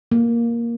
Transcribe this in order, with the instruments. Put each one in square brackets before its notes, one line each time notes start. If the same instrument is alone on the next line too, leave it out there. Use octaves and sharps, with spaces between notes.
[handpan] A#3